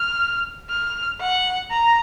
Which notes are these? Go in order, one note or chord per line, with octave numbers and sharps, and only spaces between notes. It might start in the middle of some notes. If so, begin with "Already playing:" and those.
Already playing: F6
F6
F#5
A#5